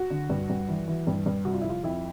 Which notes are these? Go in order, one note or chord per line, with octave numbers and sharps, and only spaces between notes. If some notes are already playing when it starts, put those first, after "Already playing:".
Already playing: F#4
D3
G2
G2
E3
E3
G2
G2
C3 F#4
F4
F2 E4
F4
F2 E4